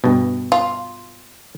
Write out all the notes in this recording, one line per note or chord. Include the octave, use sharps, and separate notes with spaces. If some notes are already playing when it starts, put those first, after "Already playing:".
G2 B2
F4